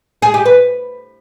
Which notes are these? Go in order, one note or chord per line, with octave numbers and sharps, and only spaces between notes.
G#4
G4
B4